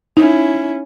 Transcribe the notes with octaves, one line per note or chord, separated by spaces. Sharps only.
C#4 D#4 E4